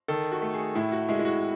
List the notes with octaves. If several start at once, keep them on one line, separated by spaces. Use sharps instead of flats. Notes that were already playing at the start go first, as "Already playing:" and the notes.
D#3 A4
F#4
A3
G#4
A2 E4
F#4
G#3 E4
E4
F#4